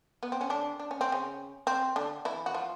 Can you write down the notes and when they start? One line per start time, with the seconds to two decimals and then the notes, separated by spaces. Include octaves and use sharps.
0.23 B3
0.32 C4
0.41 C#4
0.50 D3 D4
0.80 D4
0.91 C#4
1.01 C4
1.12 C#3 C#4
1.67 C4
1.96 D3 D4
2.25 E3 E4
2.46 F#4
2.54 F3 F4